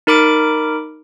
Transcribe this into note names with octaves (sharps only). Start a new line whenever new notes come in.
D#4 A#4 B5 D6 D7